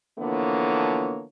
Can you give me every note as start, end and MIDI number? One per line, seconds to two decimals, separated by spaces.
0.19 1.24 50
0.19 1.24 52
0.19 1.24 53
0.19 1.24 58
0.19 1.24 59
0.19 1.24 73